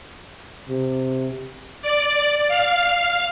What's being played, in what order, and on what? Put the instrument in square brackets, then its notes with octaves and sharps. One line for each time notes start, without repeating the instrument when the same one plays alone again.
[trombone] C3
[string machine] D5
F5